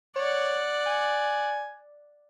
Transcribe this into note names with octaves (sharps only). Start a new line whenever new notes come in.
C#5 D5 F#5
G#5